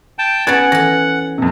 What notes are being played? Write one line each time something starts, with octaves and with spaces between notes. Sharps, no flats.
G5 A5
B3 C#4 F#5 G#6 A6 D7
E3 A4 A#6
F2 C3